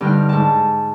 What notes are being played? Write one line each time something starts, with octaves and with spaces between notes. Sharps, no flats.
G2 D3 G3 D#4 G5 F6
G#2 A5